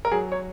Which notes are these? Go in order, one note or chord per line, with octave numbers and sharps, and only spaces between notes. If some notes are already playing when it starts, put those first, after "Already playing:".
A#4
F#3 G#4
C#5